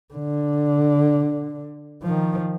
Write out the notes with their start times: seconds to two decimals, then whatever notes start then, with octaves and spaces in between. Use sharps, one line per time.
0.14 D3
2.03 D#3 F3